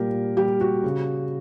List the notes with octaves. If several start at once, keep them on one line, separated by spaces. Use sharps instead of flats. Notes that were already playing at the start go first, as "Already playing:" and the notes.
Already playing: A#2 G3 G4 A#4
G3 G4
F#4
C#3